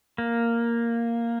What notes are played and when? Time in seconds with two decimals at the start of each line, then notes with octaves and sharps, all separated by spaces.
0.18 A#3